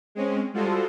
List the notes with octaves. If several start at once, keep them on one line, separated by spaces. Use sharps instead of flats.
G#3 C4 C#4
G3 G#3 F4 F#4 A4 C5